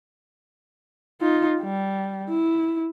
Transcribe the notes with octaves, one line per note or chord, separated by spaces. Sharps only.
D#4 F4
G3
E4